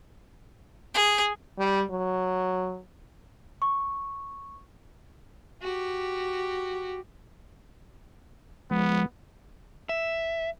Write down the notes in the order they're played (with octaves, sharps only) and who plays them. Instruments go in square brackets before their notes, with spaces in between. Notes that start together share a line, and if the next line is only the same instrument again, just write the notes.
[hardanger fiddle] G#4
[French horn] G3
F#3
[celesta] C#6
[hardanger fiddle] F#4 G4
[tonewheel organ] F3 G#3 [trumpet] B3
[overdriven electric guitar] E5